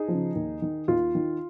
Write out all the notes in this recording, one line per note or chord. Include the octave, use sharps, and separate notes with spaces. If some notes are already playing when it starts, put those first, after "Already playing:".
Already playing: D#4 G#4
C#3 F3
D#2
D#3
D#2 F4
D#3